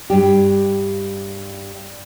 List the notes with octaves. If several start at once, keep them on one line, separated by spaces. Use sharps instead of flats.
G2 G3 G4